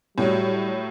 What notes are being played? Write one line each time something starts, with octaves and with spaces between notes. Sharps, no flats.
A2 F#3 G3